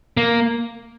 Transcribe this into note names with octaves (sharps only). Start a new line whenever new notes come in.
A#3